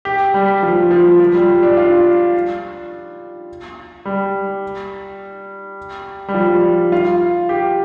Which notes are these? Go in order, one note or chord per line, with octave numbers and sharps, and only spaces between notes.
G4
G3
F3
F3
F3
G3
D4
F4
G3
G3
F3
G3
F4
G4